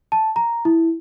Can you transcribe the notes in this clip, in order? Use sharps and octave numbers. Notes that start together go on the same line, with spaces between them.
A5
A#5
E4